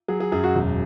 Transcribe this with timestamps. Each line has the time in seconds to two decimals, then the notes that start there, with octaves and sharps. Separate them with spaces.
0.08 F#3 G#4
0.20 G#4
0.32 F#2 G#4
0.44 F#4
0.55 E1